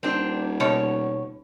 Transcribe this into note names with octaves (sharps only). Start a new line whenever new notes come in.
D#1 C4 D4
B2 C#5